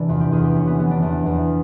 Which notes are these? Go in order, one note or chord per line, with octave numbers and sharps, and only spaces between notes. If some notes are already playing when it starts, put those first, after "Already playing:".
Already playing: C3 E3 D4
E2 F4
G4
E2 G#4
G4
C3 C#4
B3
E3 B3
D4
E2 B3
E2